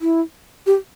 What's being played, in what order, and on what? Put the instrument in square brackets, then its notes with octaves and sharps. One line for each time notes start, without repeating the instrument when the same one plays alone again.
[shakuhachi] E4
G4